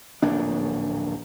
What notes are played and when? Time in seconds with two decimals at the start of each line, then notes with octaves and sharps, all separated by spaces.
0.22 D1 A#1 F#2 D4